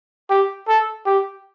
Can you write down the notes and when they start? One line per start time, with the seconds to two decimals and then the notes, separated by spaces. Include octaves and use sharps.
0.30 G4
0.68 A4
1.06 G4